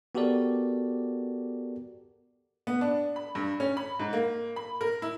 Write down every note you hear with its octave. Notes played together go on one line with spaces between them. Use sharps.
B3 F#4 G4 A4 A#4 D5
B3
D4
B5
G2
C#4
B5
G#2
A#3
B5
A#4
E4